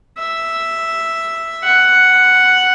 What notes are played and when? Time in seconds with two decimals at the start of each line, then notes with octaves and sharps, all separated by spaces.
0.18 E5
1.64 F#5